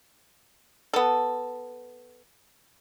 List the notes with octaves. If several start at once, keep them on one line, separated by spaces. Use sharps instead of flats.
B3 A4